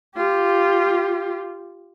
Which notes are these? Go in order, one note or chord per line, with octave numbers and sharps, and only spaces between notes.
F4 G4